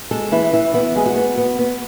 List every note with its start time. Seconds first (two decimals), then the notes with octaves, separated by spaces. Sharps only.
0.11 G#3 A4
0.32 E3 E4
0.53 E3 E4
0.74 B3 E4
0.95 G#3 G#4
1.06 F#4
1.16 B3
1.37 B3
1.59 B3